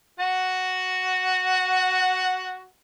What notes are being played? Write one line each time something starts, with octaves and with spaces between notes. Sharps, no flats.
F#4 F#5